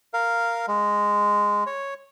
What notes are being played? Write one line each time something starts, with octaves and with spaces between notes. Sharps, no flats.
A#4 F5
G#3
C#5